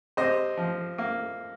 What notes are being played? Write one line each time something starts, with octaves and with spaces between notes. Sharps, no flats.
C3 C5 D#5
F3
A#3